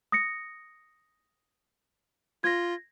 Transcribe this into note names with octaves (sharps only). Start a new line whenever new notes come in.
D#6 A#6 C#7
F4 G#6 A#6